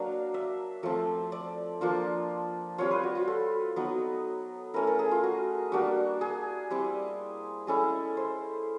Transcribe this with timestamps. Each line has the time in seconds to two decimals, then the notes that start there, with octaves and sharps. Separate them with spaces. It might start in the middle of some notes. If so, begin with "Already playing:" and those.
Already playing: F#3 A#3 D4 F5
0.34 E5
0.83 F3 A3 C4
1.32 D5
1.81 F3 A#3 D4 F4
2.78 G3 C4 F4 C#5
2.91 B4
3.03 F#4
3.15 F4
3.27 A4
3.76 F#3 B3 D#4
4.74 A3 C#4 E4 A#4
4.87 A#4
4.99 G#4
5.11 F4
5.24 F#4
5.72 G3 A#3 D4 F#4
6.21 G#4
6.70 G3 C4 E4
7.67 G#3 C#4 E4 A4
8.17 C5